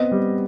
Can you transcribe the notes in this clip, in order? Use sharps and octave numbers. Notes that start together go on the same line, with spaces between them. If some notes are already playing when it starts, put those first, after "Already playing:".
Already playing: B3 C4 D#5
G3